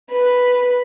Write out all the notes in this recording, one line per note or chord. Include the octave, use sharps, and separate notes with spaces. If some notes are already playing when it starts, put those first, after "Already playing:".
B4